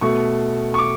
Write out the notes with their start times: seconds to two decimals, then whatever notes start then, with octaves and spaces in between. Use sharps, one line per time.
0.01 B2 A3 C#6
0.74 C#6
0.78 D6